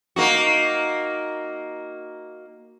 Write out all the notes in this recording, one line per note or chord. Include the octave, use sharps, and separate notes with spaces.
A#3 D#4 F#4